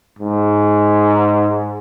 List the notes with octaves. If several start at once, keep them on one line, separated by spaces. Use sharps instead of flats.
G#2